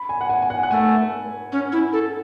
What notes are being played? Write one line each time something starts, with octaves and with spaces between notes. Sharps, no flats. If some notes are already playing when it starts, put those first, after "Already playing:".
Already playing: B5
G#5
F#5
G#5
G#5
F#5
F#5
A3 G#5
C#4
E4
A4